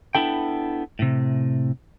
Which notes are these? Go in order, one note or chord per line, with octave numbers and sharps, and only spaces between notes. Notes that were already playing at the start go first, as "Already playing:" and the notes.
B3 D4 E4 A4 G5
A2 C3